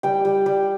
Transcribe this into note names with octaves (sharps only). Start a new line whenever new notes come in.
G3 G5
G3
G3